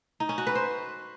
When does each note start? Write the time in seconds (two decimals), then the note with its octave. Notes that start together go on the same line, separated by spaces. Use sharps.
0.20 D#4
0.29 C#4
0.38 F#4
0.47 B4
0.55 C5